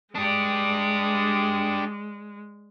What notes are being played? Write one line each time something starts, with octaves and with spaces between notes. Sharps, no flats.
G#3 D4 G4 D5 D#6